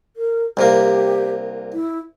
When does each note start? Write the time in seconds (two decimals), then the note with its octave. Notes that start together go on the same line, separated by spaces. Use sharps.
0.16 A#4
0.57 C2 C3 A#3 G4
1.73 E4